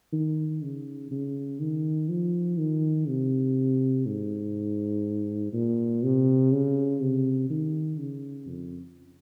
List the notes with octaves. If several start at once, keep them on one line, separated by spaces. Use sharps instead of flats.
D#3
C#3
C#3
D#3
F3
D#3
C3
G#2
A#2
C3
C#3
C3
D#3
C#3
F2